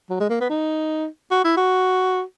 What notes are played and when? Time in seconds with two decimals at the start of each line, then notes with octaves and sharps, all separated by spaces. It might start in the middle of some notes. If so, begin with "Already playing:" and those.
0.10 F#3
0.20 G#3
0.30 A#3
0.41 B3
0.50 D#4
1.31 F#4
1.44 E4
1.57 F#4